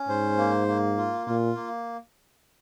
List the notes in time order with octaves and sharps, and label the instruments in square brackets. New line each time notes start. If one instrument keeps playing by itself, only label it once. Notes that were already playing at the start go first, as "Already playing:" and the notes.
Already playing: [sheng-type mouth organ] C#4
[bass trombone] G#2 [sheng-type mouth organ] C5
[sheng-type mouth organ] A#3
A#3
F4
[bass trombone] A#2 [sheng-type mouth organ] F4
[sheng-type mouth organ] A#3